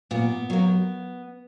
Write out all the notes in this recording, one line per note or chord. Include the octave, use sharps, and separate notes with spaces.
A#2 B3
F#3 A#3